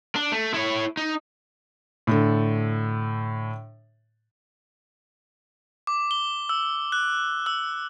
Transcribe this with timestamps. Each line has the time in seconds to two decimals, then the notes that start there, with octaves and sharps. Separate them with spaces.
0.16 D4
0.32 A3
0.54 E4 C#5
0.97 D#4
2.07 A2 D3 A4
5.87 D6
6.11 G7
6.49 E6
6.92 F#6
7.46 E6